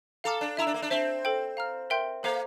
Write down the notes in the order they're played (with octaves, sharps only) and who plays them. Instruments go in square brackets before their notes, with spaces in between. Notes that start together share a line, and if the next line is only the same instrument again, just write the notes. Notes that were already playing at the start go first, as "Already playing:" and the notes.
[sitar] A4 [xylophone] F5 A#5 D6 F6
[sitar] D4
[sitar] E4 [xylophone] E5 A#5 E6
[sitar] D4
A#3
D4
[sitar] C4 [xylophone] C5 E5 A5
[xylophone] A4 C5 G5
F5 A#5 F6
A#4 E5 G5 C6 G6
[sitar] A#3 [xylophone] A4 C5 F5 A#5